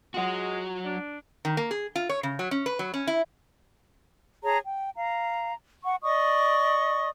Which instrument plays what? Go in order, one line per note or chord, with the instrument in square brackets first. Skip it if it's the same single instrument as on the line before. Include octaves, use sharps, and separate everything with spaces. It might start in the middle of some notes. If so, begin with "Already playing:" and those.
[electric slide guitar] F#3 F#4 [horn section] G#3 [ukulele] F4 F#5
[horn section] D4
[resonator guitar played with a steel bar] D#3
A#3
G#4
F4
C#5
C#3
F#3
C#4
B4
F#3
C#4
E4
[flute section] G#4 C#5 A5 A#5
G5
F5 A#5
F#5 C#6
D5 D#5 C#6 D#6